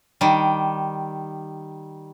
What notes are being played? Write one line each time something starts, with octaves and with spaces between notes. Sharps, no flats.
D#3 G3